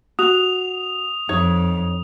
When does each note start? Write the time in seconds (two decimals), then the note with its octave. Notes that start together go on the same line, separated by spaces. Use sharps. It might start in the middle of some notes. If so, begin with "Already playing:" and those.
0.19 F#4 D#6 F7
1.29 F2 D#4 C#5